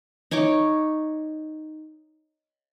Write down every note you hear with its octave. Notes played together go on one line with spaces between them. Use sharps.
D#4 C#5 C#6 D6